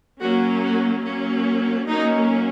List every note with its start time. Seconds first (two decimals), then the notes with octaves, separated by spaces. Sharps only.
0.21 F#3 A#3 C#4 F#4
0.63 F#4
1.04 F#3 A#3 C#4
1.87 F#3 A#3 C#4 D#4